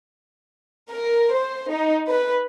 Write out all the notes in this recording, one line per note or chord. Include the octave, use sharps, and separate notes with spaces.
A#4
C5
D#4
B4